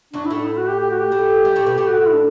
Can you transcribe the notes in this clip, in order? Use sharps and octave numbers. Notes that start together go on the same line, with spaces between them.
F#2 F#3 D4
E4
A2 A3 D4
E4
F#4
G4
G4
F#4
G4
A2 A3
G2 G3
A2 A3
B2 B3
A2 A3 G4
F#4
F#4
E4
D4